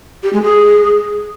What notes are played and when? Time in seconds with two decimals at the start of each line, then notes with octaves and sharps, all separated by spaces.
0.23 G4
0.33 G#3
0.43 G#4